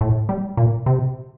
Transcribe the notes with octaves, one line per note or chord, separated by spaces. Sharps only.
A2
G3
A#2
C3